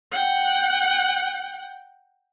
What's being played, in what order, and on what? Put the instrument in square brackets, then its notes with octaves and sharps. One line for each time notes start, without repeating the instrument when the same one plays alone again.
[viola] F#5 G5